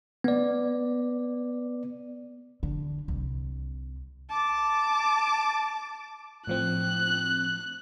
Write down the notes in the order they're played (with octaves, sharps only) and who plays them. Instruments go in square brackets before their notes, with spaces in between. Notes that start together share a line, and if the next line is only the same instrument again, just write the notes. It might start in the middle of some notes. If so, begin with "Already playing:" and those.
[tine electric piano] B3 D5
[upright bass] D3
C2
[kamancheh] A5 D6
[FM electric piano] A2 F3 C4 [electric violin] F#6